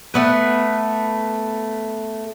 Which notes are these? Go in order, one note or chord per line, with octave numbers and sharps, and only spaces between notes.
A3 B3 B4